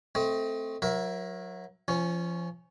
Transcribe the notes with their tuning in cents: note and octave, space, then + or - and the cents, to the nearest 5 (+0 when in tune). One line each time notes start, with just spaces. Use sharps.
A3 +0 C4 +0 D#5 +30
F#3 -20 A#4 +30 E5 +0
F3 -25 C#4 +0